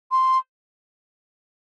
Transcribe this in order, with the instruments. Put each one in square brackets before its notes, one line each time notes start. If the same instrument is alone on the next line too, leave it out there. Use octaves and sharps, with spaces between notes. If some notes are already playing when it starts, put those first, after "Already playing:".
[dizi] C6